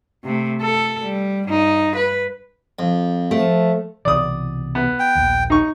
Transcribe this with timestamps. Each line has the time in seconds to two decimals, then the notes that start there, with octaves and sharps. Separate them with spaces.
0.24 C3 A3
0.62 A4
1.02 G3
1.48 G2 D#4
1.96 B4
2.79 F2
3.31 F3 A3
4.05 C2 B2 E3 D5 D#6
4.75 B3
5.00 G5
5.15 A#1 D#2
5.50 D#4 C#6